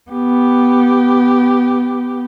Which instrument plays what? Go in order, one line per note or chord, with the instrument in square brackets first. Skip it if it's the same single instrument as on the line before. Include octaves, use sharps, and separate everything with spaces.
[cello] B3 G4